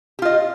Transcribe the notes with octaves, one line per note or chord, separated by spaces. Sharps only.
F4 G4 D#5